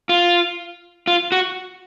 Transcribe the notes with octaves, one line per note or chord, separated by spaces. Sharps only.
F4
F4
F#4